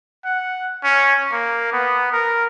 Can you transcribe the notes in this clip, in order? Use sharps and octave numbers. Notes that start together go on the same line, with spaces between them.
F#5
C#4
A#3
B3
A#4